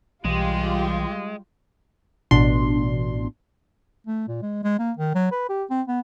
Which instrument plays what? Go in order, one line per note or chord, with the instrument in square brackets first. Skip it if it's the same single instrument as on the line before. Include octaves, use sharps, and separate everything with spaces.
[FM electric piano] B1 [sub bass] E3 [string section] G3 F4 G4 [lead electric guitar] G#3
[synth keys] A1 B2 D4 C6
[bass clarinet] A3
A#2
G#3
G#3
A#3
D#3
F#3
B4
G4
C4
B3